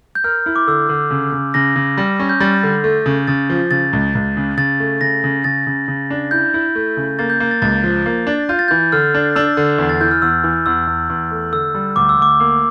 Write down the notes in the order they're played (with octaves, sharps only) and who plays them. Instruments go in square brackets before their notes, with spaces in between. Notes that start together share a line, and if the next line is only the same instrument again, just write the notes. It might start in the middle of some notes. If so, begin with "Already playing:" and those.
[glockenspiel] G6
[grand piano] A#4 [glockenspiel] F6
[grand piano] E4
[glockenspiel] D6
[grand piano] D3 [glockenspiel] E6
[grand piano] D3
C#3
C#3
[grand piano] C#3 [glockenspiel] A#6
[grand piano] C#3
G3
C#4
[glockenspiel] G6
[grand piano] G3 [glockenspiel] A6
[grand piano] D3
A3
C#3
[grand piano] C#3 [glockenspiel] A6
[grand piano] F3
[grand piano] C#3 [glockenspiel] A6
[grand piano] C#2
C#2
C#3
[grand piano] C#3 [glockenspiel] A6
[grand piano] A3
[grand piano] C#3 [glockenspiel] A#6
[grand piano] C#3
[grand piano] C#3 [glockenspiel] A6
[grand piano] C#3
C#3
D4
[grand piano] E4 [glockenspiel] G6
[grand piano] E4
A3
C#3
[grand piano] A#3 [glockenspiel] A6
[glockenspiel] G6
[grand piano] A#3
[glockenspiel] A6
[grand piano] C#2 [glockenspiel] A6
[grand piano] F3
A#3
D4
[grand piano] F4 [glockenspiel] G6
[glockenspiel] A6
G6
[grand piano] E3
[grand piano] D3 [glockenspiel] F6
[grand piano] D4
[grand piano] D4 [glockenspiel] E6
[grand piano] D3
E2
[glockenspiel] A6
[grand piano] E3 [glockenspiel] G6
[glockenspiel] F6
[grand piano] E2 [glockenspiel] E6
[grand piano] E3
[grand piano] E2 [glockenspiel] E6
[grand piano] E2
E2
A3
[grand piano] D3 [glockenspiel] E6
[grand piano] G3
[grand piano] D2 [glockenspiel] D6
[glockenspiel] E6
[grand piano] D2 [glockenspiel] D6
[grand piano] A#3